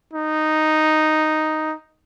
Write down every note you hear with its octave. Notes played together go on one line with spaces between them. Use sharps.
D#4